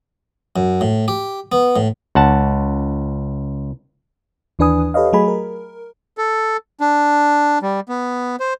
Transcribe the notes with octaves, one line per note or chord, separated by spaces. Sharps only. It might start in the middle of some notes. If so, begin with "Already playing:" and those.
F#2
A2
G4
B3
A2
C#2 F#5 A5
D#2 E3 D4 B4 G#5 D#6
G4 A4 B4 C#5 D#5 F5
F#3 A3 G#4 D#5 G#5 B5
A#4
A4
D4
G3
B3
C5